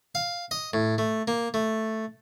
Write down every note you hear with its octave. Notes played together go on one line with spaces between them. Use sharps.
F5
D#5
A2
A3
A#3
A3